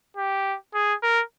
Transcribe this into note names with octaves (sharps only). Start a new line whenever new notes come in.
G4
G#4
A#4